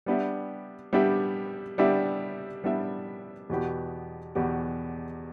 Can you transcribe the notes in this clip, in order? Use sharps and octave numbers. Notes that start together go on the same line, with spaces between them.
G3 B3 D4 G4 E5
G3 B3 D4 G4 E5
G3 B3 D4 G4 E5
G3 B3 D4 G4 E5
E2 B2 B3 G4
E2 B2 B3 G4